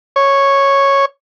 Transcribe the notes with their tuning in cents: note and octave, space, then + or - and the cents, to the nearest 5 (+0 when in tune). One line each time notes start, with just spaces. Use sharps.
C#5 -5